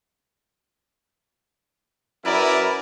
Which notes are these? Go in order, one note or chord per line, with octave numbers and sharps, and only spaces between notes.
F#2 E4 A#4 B4 D5